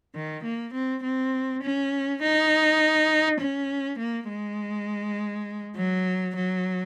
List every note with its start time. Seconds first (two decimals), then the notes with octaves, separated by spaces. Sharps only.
0.15 D#3
0.44 A#3
0.74 C4
1.03 C4
1.63 C#4
2.22 D#4
3.40 C#4
3.99 A#3
4.29 G#3
5.76 F#3
6.35 F#3